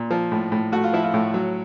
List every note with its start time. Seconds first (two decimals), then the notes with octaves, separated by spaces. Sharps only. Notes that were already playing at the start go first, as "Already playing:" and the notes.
Already playing: A#2
0.11 F3
0.32 A2
0.52 A2
0.72 A3 F#4
0.84 F4
0.93 F3 E4
1.04 F4
1.14 A2
1.34 F#3